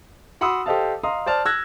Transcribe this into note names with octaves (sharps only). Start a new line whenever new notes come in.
F#4 F#5 B5 C6 D#6 E6
G4 A4 C5 D#5 F5 A5
D#5 F5 A#5 C6 D#6
C5 D5 A5 F6
E6 F#6 G#6 A#6